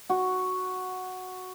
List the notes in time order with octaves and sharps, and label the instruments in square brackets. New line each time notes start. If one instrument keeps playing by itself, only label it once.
[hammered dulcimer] F#4